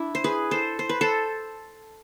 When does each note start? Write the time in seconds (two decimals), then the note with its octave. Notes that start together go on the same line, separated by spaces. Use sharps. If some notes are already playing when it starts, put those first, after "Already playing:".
Already playing: D4 E4
0.15 C5
0.24 G#4 B4
0.51 A4 C5
0.79 C5
0.89 B4
1.01 A4 C5